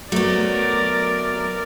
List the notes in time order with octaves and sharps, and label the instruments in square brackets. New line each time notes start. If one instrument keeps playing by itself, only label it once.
[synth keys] F#3 [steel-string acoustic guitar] A3 B3 [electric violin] A#4 D5